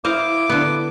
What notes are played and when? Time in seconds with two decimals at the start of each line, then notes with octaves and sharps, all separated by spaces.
0.05 E4 C5 D#5 F5 D6
0.49 D3 B3